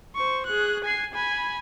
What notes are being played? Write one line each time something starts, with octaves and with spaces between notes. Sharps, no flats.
C5 C#6
G#4 F#6
G#5 C7
G#5 B5